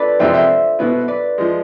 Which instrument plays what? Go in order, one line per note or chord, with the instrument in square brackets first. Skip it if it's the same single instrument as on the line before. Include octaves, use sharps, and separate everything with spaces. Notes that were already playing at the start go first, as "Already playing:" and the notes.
Already playing: [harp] D4 F4 A4 B4 D5
[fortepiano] F2 C3 G#3 [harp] C5 E5
[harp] C5 E5
[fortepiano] B2 B3 E4
[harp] B4 D5
[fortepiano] F3 G#3